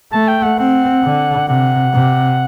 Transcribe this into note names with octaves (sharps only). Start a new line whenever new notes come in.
A3 A5
G5
F#5
C4 F#5
D3
C3 F#5
C3